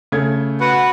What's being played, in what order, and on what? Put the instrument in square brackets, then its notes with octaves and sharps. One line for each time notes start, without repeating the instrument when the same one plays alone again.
[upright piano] C#3 A3 G#6
[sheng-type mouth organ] F#4 B4 F#5